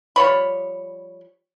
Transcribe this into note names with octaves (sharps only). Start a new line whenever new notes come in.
F3 G3 C#5 B5